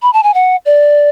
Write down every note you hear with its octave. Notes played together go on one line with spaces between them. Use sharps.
B5
A5
G#5
F#5
D5